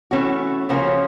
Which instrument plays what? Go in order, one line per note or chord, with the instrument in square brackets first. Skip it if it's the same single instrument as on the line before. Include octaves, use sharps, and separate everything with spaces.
[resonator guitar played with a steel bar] E3 A3 C#4 F#4
C#3 F3 A#3 C#4 F#4